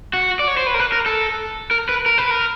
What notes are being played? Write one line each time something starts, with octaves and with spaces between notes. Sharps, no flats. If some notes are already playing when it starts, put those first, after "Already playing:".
F#4
D5
C#5
C5
B4
A#4
B4
A#4
A4
A#4
B4
A#4
B4
A#4